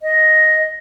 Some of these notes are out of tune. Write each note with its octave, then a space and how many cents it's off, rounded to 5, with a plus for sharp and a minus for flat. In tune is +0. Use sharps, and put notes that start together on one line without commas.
D#5 +5